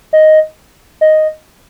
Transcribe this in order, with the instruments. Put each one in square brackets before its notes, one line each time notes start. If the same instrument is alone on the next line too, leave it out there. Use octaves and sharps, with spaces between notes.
[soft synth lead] D#5
D#5